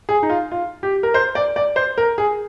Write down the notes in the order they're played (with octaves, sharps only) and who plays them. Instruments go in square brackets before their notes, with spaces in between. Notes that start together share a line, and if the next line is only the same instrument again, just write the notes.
[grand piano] G#4
D#4
F4
F4
G4
A#4
C5
D5
D5
C5
A#4
G#4